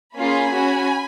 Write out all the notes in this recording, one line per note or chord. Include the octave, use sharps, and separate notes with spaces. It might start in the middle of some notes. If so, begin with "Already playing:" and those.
A#3 C#4 F4 G#4 G#5 B5
C#4 F#4